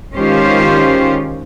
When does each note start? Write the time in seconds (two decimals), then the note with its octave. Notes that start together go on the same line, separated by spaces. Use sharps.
0.15 D#3 G#3 C#4 F4 G4 C5